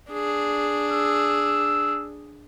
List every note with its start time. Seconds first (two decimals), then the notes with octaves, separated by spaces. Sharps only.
0.12 D4 G#4
0.92 E6